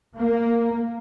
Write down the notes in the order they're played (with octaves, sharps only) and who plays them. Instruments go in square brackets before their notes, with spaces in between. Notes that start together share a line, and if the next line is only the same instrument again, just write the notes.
[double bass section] A#3